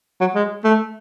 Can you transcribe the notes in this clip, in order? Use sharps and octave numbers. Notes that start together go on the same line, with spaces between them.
F#3
G#3
A3